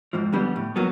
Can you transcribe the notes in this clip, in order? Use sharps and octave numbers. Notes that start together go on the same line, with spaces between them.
F2 G#2 F3
F2 D3 G3 B3
A2
G2 F#3 A#3 B3